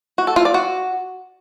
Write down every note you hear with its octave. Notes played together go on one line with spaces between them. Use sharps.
F#4
A4
F4
D5
F#4